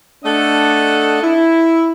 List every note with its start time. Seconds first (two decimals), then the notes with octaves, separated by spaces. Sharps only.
0.25 A3 D4 A4 D#5 F#5
1.22 E4